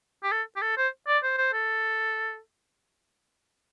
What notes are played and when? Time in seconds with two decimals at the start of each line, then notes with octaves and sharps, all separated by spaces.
0.24 G4
0.32 A4
0.56 G4
0.62 A4
0.77 C5
1.08 D5
1.23 C5
1.38 C5
1.53 A4